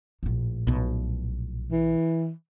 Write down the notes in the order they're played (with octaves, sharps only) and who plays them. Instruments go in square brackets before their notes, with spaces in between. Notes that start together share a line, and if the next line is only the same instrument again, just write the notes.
[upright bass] A#1 A2
[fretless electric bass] B1 B2
[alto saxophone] E3